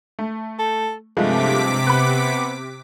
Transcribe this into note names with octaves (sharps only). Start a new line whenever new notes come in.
A3
A4
G2 C3 F3 G#3 A3 D6 B6
B3 B5 F#6